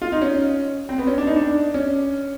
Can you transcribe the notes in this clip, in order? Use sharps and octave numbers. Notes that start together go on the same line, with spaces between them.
F4
D#4
C#4
C4
B3
C#4
D4
D#4
D4
C#4